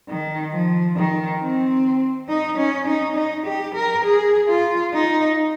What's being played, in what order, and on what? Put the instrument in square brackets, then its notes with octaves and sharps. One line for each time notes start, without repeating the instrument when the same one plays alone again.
[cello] D#3
F3
D#3
C4
D#4
C#4
D#4
D#4
G4
A#4
G#4
F4
D#4